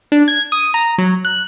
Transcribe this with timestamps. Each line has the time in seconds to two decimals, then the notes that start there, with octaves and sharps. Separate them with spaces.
0.12 D4
0.28 G#6
0.52 D#6
0.74 A#5
0.98 F#3
1.25 F#6